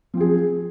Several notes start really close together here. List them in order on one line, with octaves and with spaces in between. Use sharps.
F3 C4 G#4